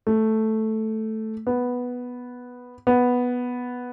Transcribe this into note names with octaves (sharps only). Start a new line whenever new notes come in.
A3
B3
B3